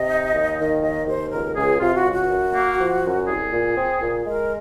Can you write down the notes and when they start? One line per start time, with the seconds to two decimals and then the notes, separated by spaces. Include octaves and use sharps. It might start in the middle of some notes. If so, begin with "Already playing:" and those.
Already playing: C3 D#5
0.09 D#4
0.33 D#2
0.58 D#3
0.82 D#2 D#5
1.06 D#2 C5
1.31 C#2 A#4
1.56 C#2 G#4
1.80 C3 F4
1.96 F#4
2.05 C#2
2.13 F#4
2.29 F#2
2.53 A#3
2.79 F3
3.04 F#2
3.27 C2 G#4
3.52 A#2
3.76 C4
4.01 A#2
4.25 G#3 A#4